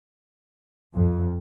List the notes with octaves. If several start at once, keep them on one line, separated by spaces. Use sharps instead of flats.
F2